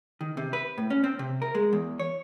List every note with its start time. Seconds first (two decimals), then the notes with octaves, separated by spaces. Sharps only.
0.21 D#3
0.37 C3
0.53 B4
0.78 A2
0.90 C#4
1.04 C4
1.19 C3
1.42 A#4
1.55 G#3
1.73 E2
1.99 C#5